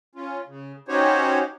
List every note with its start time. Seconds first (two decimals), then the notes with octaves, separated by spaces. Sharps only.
0.15 C#4 F4
0.47 C#3
0.88 C#4 D#4 F#4 G4 C5 C#5